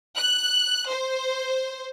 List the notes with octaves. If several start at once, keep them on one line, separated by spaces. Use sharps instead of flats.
F#6
C5